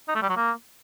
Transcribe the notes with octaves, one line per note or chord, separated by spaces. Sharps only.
D#4
A3
G3
F#3
A#3